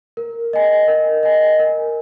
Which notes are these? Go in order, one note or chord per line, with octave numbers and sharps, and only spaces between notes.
A#4
D#5 G#5
A#4
D#5 G#5
A#4